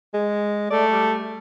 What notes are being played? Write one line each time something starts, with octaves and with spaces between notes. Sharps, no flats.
G#3
A3 D5
G3